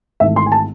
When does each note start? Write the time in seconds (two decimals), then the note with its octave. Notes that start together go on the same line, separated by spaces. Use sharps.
0.20 G#1 G#2 E3 A3 E5
0.36 C6
0.46 G#5
0.52 A5